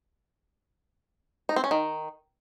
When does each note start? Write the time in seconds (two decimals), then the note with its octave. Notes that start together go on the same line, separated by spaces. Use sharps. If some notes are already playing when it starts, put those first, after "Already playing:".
1.49 D#4
1.56 C4
1.64 C#4
1.71 D#3